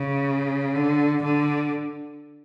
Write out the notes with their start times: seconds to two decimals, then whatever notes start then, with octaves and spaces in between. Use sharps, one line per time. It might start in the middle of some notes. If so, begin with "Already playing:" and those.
Already playing: C#3
0.76 D3
1.23 D3